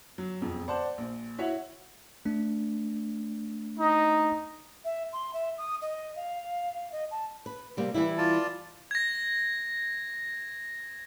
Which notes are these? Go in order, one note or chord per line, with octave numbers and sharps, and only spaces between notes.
F#3
E1 F2
C5 D5 F#5 A5
A#1
E4 F#4 C#5 E5 F#5
A3 D4
D#4
E5
C6
E5
D#6
D#5
F5
D#5
A5
B4
C3 G3 A#3
E3 G3 E4
F4 D5 A5
G#6 A#6